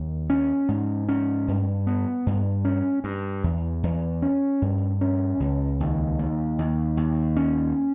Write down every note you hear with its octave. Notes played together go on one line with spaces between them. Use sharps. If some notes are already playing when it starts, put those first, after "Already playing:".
Already playing: D#2
C#4
G#2
C#4
G2
B3
G2
C#4
G2
E2
E2
C#4
G2
C#4
C#2
D#2
D#2
D#2
D#2
C#4